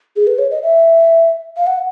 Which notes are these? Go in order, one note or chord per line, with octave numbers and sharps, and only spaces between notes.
G#4
B4
C#5
D#5
E5
F5
F#5